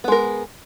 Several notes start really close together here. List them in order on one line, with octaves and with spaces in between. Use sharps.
B3 G#3 A#4